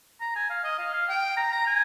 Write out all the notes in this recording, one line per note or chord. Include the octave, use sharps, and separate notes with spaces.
A#5
G#5
F5
D#5
F5
F5
G5
A#5
A#5
G#5